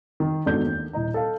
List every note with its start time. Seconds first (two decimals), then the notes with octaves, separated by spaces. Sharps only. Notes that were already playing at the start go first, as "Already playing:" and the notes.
0.20 D#3
0.46 E2 G#2 D4 F#4 A4 G6
0.63 D#2
0.93 D#1 E4 D#5 A#5
1.14 A4 F5